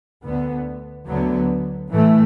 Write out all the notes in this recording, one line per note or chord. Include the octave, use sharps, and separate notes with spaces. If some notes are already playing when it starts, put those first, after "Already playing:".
D2 D3 B3
D2 D3 F#3 B3
A2 E3 A3